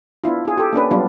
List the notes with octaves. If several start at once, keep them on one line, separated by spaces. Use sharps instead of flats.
B3 D4 E4 F4
F4 G#4
G4 A4
A#3 C#4 D4 B4
F#3 G3 B3 D4 F4